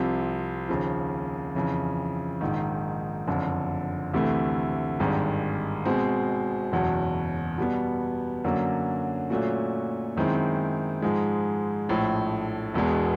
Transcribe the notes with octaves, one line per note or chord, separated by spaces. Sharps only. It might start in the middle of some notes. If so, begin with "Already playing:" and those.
Already playing: C2 C3 F3
D#2 C#3 F3
F2 C#3 E3
A#1 G#2 D#3
F#1 F2 D3
D2 C3 E3 A3
G#1 G2 D#3 G#3
B2 G#3 C4
F#1 E2 B2 F#3
B2 G3 B3
F#2 D3 F#3 A#3 C#4
A#2 F#3 A3 C#4 F#4
F#2 D#3 G#3 C4 E4
G#2 F3 G#3
A#1 A2 F3
E1 E2 B2 G#3 B3